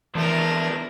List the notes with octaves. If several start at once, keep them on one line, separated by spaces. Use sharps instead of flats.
E2 E3 F3 A3 D4 A#4